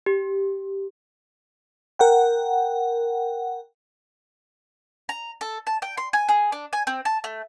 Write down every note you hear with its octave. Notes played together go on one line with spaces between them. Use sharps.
G4
A#4 F#5 G5
A#5
A4
A5
G5
C6
G#5
G#4
D4
G#5
C4
A5
A3